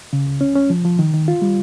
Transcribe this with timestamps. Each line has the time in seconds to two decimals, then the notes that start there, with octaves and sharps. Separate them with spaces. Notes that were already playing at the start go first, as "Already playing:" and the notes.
0.13 C#3
0.27 C#2
0.41 C#4
0.55 C#4
0.70 F3
0.85 F3
0.99 D#3
1.13 D#3
1.28 F4
1.42 G3